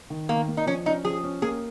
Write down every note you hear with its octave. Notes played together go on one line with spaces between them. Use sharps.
D#3
D#3 A#3
A#3
D#4
F3 C#4
C#4 D#4
F3 G#4
C#4
A#3 G#4